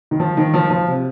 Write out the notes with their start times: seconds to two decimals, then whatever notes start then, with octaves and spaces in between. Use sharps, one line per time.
0.11 D#3
0.20 F3
0.37 D#3
0.54 F3
0.70 F3
0.87 C3